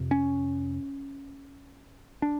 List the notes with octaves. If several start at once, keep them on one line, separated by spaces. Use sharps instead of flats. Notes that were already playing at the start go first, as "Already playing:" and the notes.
Already playing: F2 C3
C#4
D4